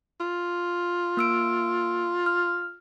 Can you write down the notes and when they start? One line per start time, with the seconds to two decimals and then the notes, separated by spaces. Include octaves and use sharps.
0.20 F4
1.17 A#3 E6 D7
2.26 F6